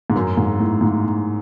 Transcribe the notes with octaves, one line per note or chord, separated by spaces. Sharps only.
G#2
F#2
G#2
A2
G#2